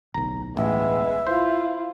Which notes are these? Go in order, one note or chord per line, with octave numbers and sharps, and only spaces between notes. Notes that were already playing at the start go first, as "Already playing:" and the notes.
D1 B1 A#5
A1 G#3 B3 E5
E4 F4 C5